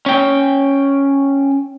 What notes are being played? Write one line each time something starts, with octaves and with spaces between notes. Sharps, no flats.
C#4 G5